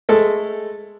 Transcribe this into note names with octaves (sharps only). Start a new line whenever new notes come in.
G#3 A3 A4